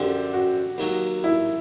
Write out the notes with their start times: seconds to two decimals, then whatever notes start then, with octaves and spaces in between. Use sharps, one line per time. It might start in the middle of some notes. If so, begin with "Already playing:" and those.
Already playing: F#2 D3 F3 G4
0.34 F#4
0.78 D#2 D#3 F#3
1.24 E4